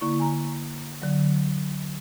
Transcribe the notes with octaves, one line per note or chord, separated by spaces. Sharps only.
D3 A#3 E4 C#6
G#5 A#5
D3 F#3